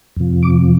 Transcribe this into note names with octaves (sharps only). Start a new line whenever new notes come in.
F2 C3 F3
D6